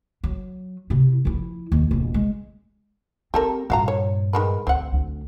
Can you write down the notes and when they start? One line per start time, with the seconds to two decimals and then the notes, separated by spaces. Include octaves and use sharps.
0.24 F#3
0.90 C3 E4
1.25 F3 E4
1.72 D#2
1.91 E1 A#2
2.14 G#3
3.34 C4 G4 A4 A#4
3.70 G2 A#2 F#4 F5 A#5
3.88 C#5
4.33 D#3 G#3 B4
4.67 D2 C4 F#5
4.92 D2 D4